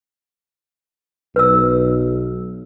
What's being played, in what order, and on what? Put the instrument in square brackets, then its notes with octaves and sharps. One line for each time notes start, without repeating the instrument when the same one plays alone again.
[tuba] B1 [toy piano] B4 E6